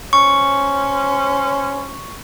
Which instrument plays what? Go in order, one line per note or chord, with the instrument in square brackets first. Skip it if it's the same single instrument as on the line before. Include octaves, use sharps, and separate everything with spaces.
[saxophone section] C#4 C5 C#5 [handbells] C#6